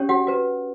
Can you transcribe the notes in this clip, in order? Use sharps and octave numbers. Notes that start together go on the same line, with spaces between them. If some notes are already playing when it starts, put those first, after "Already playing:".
Already playing: C#4 G4 C#5
F#4 F#5
F#4 B4